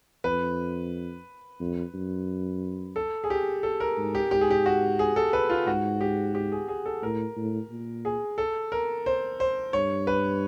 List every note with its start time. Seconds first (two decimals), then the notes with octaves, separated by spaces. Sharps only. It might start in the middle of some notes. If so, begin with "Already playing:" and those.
0.24 F2 B4
1.60 F2
1.94 F#2
2.96 A4
3.24 G#4
3.30 G4
3.63 A4
3.80 A#4
3.97 G#2
4.15 G4
4.31 G#2 G4
4.41 G#4
4.51 G4
4.66 F#4
4.99 G#4
5.16 A4
5.33 B4
5.50 F4
5.67 G#2 F#4
6.01 G4
6.35 G4
6.52 G#4
6.69 G#4
6.86 A4
7.02 A2 A#4
7.37 A2
7.70 A#2
8.05 G#4
8.38 A4
8.72 A#4
9.06 C5
9.40 C5
9.73 G2 C#5
10.07 B4